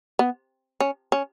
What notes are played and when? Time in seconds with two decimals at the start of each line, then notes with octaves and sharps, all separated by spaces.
0.19 B3
0.80 C#4
1.12 C#4